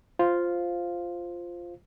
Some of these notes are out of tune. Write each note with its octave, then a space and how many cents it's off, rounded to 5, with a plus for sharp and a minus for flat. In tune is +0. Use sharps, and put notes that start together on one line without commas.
F4 +0 C5 +0 F5 +0